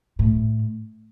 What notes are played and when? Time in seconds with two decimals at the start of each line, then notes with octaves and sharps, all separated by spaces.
0.19 A2